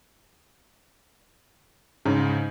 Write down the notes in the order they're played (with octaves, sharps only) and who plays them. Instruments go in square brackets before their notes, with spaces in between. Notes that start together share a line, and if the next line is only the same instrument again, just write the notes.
[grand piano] G#2 [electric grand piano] C#3